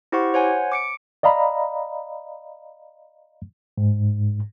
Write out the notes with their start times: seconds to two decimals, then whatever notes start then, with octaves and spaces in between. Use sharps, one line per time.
0.12 E4 G4 C5 F#5 C#6
0.34 C5 C#5 F#5 G#5
0.72 D6 C#7 D7
1.23 D5 D#5 F5 A#5 B5
3.78 G#2